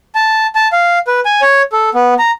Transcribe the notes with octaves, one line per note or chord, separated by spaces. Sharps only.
A5
A5
F5
B4
G#5
C#5
A4
B3
A#5